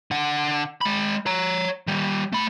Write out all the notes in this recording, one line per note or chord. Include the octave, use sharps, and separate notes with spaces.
D3 F#5
G#3 B5
C#5 A#5
D#3 G3
A3 B5